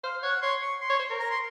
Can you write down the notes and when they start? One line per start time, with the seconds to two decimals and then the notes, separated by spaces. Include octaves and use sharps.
0.04 C5 F5
0.23 C#5 F#5
0.42 C#5 C6
0.62 C#6
0.81 C6
0.90 C#5
0.99 C5
1.10 A#4
1.20 A#5
1.30 C6